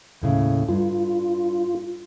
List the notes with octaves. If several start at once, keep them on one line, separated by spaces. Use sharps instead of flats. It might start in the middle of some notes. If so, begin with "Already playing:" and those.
D#2 A2 C#3
G2 F4